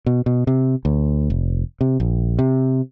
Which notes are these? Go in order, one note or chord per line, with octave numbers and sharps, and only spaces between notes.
B2
B2
C3
D2
F1
C3
A#1
C3